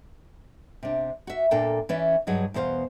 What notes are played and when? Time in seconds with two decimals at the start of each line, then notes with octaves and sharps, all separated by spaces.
0.83 C3 D4
1.27 F#4 E5
1.51 A#2 D4 A4 A#4 G5
1.89 E3 C#4 D5 E5
2.27 G2 F#3 G#4 D#5
2.54 E2 B2 C5 E5 F5